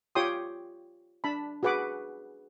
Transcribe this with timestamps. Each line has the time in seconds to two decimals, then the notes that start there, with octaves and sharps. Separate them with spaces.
0.15 F4 G4 C#5 G5 C6 D#6
1.24 D4 A5 B5
1.63 F#4 G#4 B4 F#5 D6